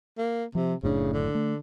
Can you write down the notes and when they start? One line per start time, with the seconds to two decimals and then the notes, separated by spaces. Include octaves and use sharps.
0.18 A#3
0.55 C3 F3
0.83 F#1 A2 C#3 D4
1.13 D3
1.35 A3